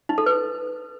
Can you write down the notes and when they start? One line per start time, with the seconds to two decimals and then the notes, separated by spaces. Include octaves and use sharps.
0.09 D#4
0.18 A4
0.26 B4